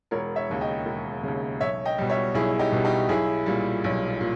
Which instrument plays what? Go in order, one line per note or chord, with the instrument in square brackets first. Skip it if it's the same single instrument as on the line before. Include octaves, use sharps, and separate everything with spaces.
[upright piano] E1 A#4 C#5
C#5 E5
D#2 C#3
D#5 G5
E1
D#2 C#3
B1 C#5 E5
D#5 G5
B2 G3
C#5 E5
B1 E4 G#4
D#4 G4
B2 G3
D#4 G4
B1 E4 G#4
A#2 G3
B1
A#2